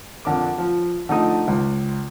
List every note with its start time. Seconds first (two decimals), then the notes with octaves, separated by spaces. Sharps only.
0.25 F2 D3 D4 A#4 D6
0.58 F3
1.09 D3 F3 A3 D#4 D#6
1.48 C#2